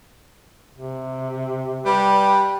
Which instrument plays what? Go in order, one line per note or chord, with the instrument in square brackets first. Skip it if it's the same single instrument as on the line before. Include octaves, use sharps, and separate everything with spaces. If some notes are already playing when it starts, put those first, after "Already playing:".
[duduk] C3
[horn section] G3 G4 B4